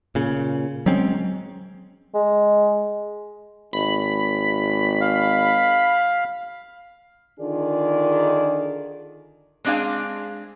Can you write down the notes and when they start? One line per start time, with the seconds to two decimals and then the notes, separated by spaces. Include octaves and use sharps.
0.15 A#2 C#3
0.86 F#3 G#3 C4 C#4
2.14 G#3
3.73 G#1 B5
5.01 F5
7.40 D3 D#3 D4 F4 G#4 D5
9.65 G#3 C4 D4 G#4 F5